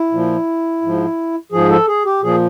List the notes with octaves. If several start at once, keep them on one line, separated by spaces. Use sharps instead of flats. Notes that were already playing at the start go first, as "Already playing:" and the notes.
Already playing: E4
A#2 F3
G#2 F3
G#2 F3 G#4
A4
G#4
G4
A#2 F3 G#4